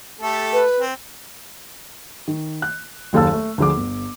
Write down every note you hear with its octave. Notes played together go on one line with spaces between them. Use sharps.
A3 G4 A4
B4
C4
D#3
F#6
F#1 D#2 A4 F5 A5 E6
A3
D2 D3 F3 G#4 D6
G1